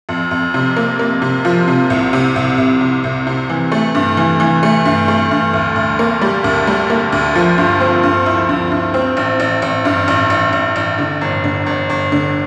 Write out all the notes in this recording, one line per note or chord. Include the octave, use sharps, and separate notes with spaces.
F2
F2
C3
A#3
A#3
C3
F3
C3
C2
C3
C2
C2
C3
C2
C3
E3
A3
G2
E3
E3
A3
G2
A3
G2
D2
D2
A#3
G3
D2
G3
A#3
D2
F3
G2
C4
G2
E4
G2
G2
C4
A1
A1
A1
G2
A1
A1
A1
A1
D3
G1
D3
G1
G1
D3